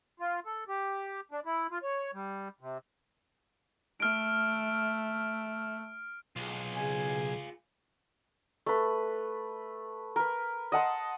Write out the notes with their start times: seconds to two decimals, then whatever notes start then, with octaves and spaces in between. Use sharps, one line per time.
0.20 F4
0.46 A4
0.68 G4
1.31 D4
1.46 E4
1.71 F4
1.83 C#5
2.13 G3
2.61 C3
4.00 A3 F6 D7
6.36 B1 F4 G#4
6.75 C#3 G#5
8.66 A3 B4
10.16 A#4 B4
10.72 D#5 F#5 A5 C6